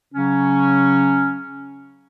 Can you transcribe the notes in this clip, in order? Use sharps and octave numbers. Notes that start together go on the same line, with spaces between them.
C#3 F#3 C#4